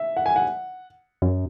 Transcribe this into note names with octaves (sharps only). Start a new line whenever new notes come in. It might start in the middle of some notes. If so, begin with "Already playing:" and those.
Already playing: E5
F#5
G#5
F#5
F#2